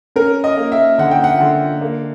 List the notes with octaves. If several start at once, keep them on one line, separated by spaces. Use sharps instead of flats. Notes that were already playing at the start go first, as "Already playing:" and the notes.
C#4 A#4
D#5
A#3
E5
D3 F#5
G5
F#5
D3
A#3